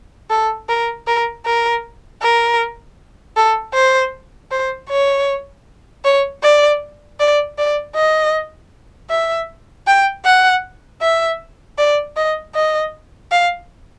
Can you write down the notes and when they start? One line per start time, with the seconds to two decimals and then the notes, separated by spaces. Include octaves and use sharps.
0.30 A4
0.69 A#4
1.07 A#4
1.46 A#4
2.22 A#4
3.37 A4
3.74 C5
4.51 C5
4.90 C#5
6.05 C#5
6.43 D5
7.20 D5
7.58 D5
7.95 D#5
9.10 E5
9.87 G5
10.25 F#5
11.02 E5
11.78 D5
12.16 D#5
12.55 D#5
13.32 F5